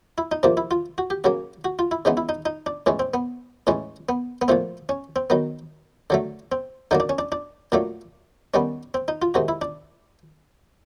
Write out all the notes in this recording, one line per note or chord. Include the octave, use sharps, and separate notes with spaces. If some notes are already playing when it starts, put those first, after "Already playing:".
E4
D#4
C3 F3 A#3 D4
E4
F4
F#4
G4
C#3 F#3 A#3 F#4
F#4
F4
E4
C#3 E3 G#3 B3 D#4
E4
D#4
D#4
D4
A2 E3 G#3 C#4
C4
B3
A2 E3 G#3 C#4
B3
B3
A#2 F3 A3 C4
C#4
C4
D#3 F#3 B3
D3 F#3 A3
C4
D3 F#3 A#3 D#4
D4
C#4
D4
D4
A#2 F#3 A3 D4
D#3 G3 B3 C#4
C4
D#4
F4
C3 D#3 G#3 F#4
E4
D4